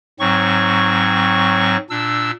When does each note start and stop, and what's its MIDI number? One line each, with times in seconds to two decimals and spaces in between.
0.20 1.77 44
0.20 1.77 54
0.20 1.77 60
0.20 1.77 85
1.90 2.31 46
1.90 2.31 62
1.90 2.31 88